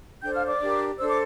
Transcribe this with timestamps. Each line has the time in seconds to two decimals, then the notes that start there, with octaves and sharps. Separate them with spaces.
0.21 D4 A4 C5 G5 G6
0.34 F5 F6
0.47 D5 D6
0.60 D4 G4 A#4
0.98 D4 A4 C5 E6
1.07 D6